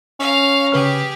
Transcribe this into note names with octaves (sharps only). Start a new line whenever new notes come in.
C#4 F5 A#5
C#3 G4 G#4 B4 F6